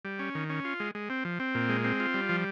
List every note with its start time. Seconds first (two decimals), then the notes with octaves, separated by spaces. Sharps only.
0.05 G3
0.19 C#4
0.35 D#3
0.50 C#4
0.65 F4
0.80 G#3
0.95 G#3
1.10 C4
1.25 F3
1.40 C4
1.55 A#2
1.69 G#3
1.84 C4
2.00 F4
2.14 G3
2.29 F3